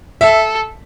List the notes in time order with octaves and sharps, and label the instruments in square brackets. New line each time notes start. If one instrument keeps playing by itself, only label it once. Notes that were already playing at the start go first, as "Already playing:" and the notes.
[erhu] A4 [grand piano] E5